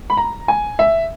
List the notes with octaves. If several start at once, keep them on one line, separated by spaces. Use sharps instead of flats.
B5
A#5
G#5
E5